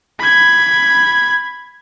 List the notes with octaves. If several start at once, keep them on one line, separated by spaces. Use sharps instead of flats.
B5 G#6